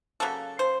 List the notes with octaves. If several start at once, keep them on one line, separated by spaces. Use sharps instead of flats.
C#3 F#3 A#3 A4
C5